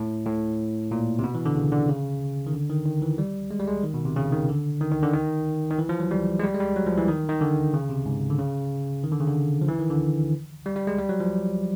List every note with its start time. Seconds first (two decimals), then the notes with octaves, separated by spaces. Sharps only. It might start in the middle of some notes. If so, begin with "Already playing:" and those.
Already playing: A2
0.26 A2
0.91 A#2
1.19 C3
1.24 B2
1.35 E3
1.45 D3
1.56 C#3
1.72 D3
1.88 C#3
2.46 D#3
2.53 D3
2.70 D#3
2.86 D#3
3.02 E3
3.18 G3
3.51 G#3
3.59 G3
3.68 G#3
3.84 D#3
3.94 B2
4.05 C3
4.16 C#3
4.32 D#3
4.49 D3
4.81 D#3
4.92 D#3
5.02 D3
5.14 D#3
5.71 D#3
5.78 E3
5.89 F3
6.00 F#3
6.11 G3
6.39 G#3
6.44 G3
6.54 G#3
6.60 G3
6.76 F#3
6.87 F3
6.98 E3
7.08 D#3
7.29 D#3
7.41 D3
7.74 C#3
7.90 C3
8.06 G#2
8.30 D3
8.38 C#3
9.03 D#3
9.11 D3
9.20 C#3
9.28 D3
9.61 F3
9.68 E3
9.79 D#3
9.90 D3
10.66 G3
10.76 G3
10.87 G#3
10.98 G3
11.09 F#3
11.20 F3